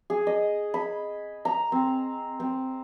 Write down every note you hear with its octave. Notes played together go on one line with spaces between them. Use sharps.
G#4
D#5
B5
A#5
C4
C4